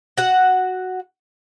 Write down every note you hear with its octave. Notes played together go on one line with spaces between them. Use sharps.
F#4 F#5